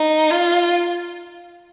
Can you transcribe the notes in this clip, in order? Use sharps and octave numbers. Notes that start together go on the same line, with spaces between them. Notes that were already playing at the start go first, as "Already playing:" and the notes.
Already playing: D#4
F4